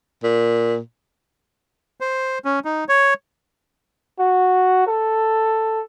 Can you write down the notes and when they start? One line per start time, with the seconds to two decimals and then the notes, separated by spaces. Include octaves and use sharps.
0.23 A#2
2.00 C5
2.45 C#4
2.65 D#4
2.89 C#5
4.19 F#4
4.87 A4